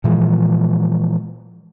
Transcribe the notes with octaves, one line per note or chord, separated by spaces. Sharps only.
A#2 E3 F3 G#3